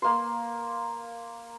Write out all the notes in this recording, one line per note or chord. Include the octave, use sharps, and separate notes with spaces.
A#3 C6